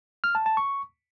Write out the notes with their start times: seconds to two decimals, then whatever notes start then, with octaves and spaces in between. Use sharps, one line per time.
0.24 F6
0.35 A5
0.46 A5
0.57 C#6